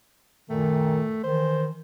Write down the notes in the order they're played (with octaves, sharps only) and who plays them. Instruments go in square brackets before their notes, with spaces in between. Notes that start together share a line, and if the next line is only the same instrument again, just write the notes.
[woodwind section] F#2 A#2 D#3 [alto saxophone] A3
[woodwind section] D#3 E3 [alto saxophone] C5